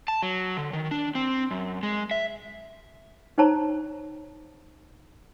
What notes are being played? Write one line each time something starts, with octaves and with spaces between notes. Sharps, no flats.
A5
F#3
D3
D#3
D4
C4
F#2
G#3
E5
D#4 C5 C#5 A5 A#5